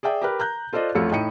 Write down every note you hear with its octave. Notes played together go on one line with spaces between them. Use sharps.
G#4 D5 E5 G5
G4 A#4 B4
A#5 F#6 G6
F4 A4 C5 D5 D#5
A1 F2 A3 F4 E6 C#7
A2 D#4 G5 B5 C#7 D#7